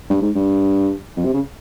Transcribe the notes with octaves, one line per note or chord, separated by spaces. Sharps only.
G2
G#2
G2
F2
C3
C#3